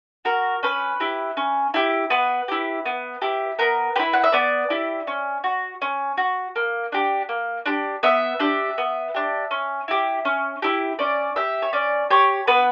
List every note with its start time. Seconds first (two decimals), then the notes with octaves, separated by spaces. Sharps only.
0.25 F#4 A#4
0.63 C#4 B4
1.00 E4 G4
1.37 C#4
1.74 E4 G4
2.10 B3 B4
2.48 E4 G4
2.86 B3
3.22 E4 G4
3.59 B3 A#4
3.96 E4 G4 B4
4.13 F#5
4.24 E5
4.32 B3 D5
4.70 E4 G4
5.07 C#4
5.44 F#4
5.82 C#4
6.18 F#4
6.56 A#3
6.92 D4 G4
7.29 A#3
7.66 D4 G4
8.03 B3 E5
8.40 D4 G4
8.78 B3
9.14 D4 G4
9.51 C#4
9.88 E4 G4
10.25 C#4
10.62 E4 G4
10.99 C#4 D5
11.36 G4 E5
11.62 C#5
11.73 C#4 D5
12.10 G4 C#5
12.47 B3 B4